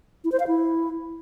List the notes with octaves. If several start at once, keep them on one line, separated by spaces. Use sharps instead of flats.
E4
C5
F5
E4